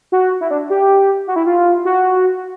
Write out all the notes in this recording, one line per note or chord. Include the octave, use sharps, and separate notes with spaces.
F#4
E4
D4
G4
F#4
E4
F4
F#4